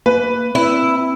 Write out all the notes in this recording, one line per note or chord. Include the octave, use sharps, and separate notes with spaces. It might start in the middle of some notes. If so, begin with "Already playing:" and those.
A#3 B4
C4 E4